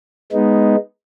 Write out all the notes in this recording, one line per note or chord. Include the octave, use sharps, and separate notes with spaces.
G#3 B3 D#4